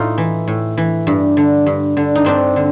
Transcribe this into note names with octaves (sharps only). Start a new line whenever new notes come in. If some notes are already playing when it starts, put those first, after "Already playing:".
Already playing: A2 D#4 F4
E3
A2
E3
G2
D3
G2
D3
D#4
G2 C4 D4
D3